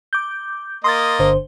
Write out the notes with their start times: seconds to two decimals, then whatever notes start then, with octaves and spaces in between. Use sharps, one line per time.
0.13 D6 G6
0.84 A#3 D#5 C6 D#6 A6
1.19 G1 D3 C5